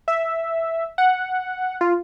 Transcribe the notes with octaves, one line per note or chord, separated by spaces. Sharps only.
E5
F#5
F4